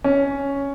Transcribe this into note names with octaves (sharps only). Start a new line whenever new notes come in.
C#4